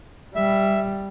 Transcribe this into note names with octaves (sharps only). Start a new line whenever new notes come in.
G3 E5